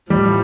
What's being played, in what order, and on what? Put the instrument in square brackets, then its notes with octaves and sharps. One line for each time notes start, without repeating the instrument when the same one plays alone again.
[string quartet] A2 F3 [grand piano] G3